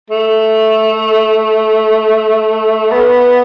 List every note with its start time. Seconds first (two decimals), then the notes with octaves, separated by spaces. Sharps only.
0.10 A3
2.91 B3